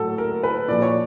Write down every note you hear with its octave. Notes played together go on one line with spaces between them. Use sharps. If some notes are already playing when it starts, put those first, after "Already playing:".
Already playing: A2 F#3 A4
A#4
B4
A#2 F3 D5
C#5